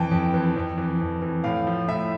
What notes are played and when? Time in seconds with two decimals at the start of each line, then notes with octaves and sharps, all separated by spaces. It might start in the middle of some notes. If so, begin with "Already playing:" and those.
Already playing: F2 E3 G5 A5
0.11 F2
0.34 E3
0.56 F2
0.78 E3
1.00 F2
1.22 E3
1.44 A2 F5
1.67 F3
1.88 A2 E5